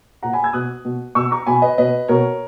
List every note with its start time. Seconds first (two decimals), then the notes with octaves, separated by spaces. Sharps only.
0.23 A#2 F#5 A#5
0.33 G#5 B5
0.44 E6 G#6
0.53 B2 D#6 F#6
0.85 B2
1.15 B2 C#6 E6
1.31 A#5 C#6
1.47 B2 G#5 B5
1.62 B4 D#5
1.78 B2 B4 D#5
2.08 B2 A#4 C#5